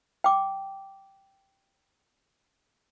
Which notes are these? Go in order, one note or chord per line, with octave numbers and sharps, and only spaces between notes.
G5 D6